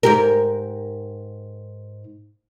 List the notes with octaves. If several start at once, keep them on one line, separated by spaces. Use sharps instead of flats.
G#2 G4 A#4